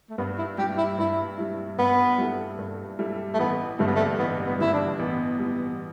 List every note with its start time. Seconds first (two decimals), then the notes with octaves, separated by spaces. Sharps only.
0.10 A3
0.18 G2 B3
0.38 E4
0.58 G3 G4
0.62 E4
0.77 E4
0.98 G2 E4
1.38 G3 E4
1.78 G2 B3
2.18 G3 E4 A4
2.58 G2
2.99 G3 E4 A4
3.34 A3
3.39 A1 B3
3.79 G2 D3 G3 A3
3.87 B3
3.95 A3
4.18 A1 B3
4.46 B3
4.59 G2 D3 G3 E4
4.73 D4
4.99 A1 B3
5.39 A2 G3